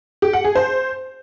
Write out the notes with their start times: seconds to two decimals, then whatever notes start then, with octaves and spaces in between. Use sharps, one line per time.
0.22 G4
0.33 F#5
0.44 G#4
0.56 C5